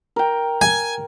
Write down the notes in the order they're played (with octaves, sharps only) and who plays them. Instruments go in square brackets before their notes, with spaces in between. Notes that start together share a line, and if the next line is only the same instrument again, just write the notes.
[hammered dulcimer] A#4 G5
[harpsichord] G#5